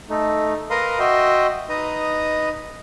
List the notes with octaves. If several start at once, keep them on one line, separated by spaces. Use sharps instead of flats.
A3 D#4
A#4 B4 F5 A#5 C6 D#6
F#4 D#5 E5 G5 C6
D#4 B4 D#5 A#5 D#6